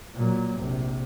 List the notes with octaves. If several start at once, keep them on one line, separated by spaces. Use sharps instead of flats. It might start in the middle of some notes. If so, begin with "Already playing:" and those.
A#2 F#3
A#1 C3